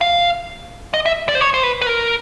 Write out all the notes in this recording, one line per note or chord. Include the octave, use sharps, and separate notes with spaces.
F5
D#5
E5
D5
C5
C#5
C5
B4
B4
A#4